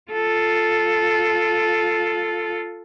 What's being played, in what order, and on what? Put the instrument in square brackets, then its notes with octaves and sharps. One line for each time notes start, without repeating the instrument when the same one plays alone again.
[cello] F4 A4